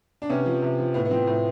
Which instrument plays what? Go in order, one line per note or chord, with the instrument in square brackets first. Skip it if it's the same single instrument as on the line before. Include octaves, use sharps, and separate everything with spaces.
[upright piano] D4
C3 B3 C#4
F3
C3
F3
A2 B3
B3
F3 C4
A2